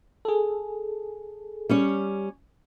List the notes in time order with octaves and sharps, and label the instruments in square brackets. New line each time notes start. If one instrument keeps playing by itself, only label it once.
[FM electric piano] G#4 A4
[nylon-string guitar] G3 C#4 C#5